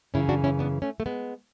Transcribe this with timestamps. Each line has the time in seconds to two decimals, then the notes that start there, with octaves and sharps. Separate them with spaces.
0.14 F#2 C#3 E3 C#4 E4
0.29 D4 F#4
0.44 C#4 E4
0.59 B3 D4
0.82 A3 C#4
1.00 A3
1.06 G#3 B3